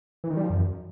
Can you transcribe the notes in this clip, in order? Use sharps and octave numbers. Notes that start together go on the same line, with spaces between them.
E3
D#3
G3
F3
F#2